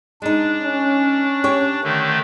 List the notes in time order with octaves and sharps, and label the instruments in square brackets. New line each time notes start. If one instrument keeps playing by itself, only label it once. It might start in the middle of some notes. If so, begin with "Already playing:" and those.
[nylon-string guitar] G#3 D#4 [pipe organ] D4
[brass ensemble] C#4
[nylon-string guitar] G4 C#5
[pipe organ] D3 D#3 A3